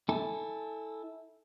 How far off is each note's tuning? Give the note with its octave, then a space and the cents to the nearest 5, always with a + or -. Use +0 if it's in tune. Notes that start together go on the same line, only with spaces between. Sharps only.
E4 -25 A4 +0 G#5 +0